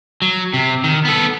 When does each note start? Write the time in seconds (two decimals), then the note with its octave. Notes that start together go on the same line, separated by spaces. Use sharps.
0.22 F#3
0.54 C3
0.84 D#3
1.05 B3 A4